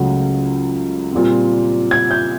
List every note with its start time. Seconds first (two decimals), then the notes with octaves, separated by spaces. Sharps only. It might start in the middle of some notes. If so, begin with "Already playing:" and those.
Already playing: C#2 C#3 F#3 A3
1.12 A#2 G3 C4
1.91 G#6
2.11 G6